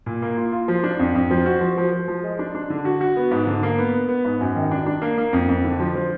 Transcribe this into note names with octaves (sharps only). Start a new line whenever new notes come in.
A#2
A#3
F4
F4
F3
D4
F2
F2
F3
F#4
F3
F3
F3
F3
G#3
D4
D4
D3
F#4
F#4
B3
G#2
D3
A#3
B3
B3
B3
G#2
F#2
D#3
D4
D4
A#3
A#3
F2
F2
D3
F3
F3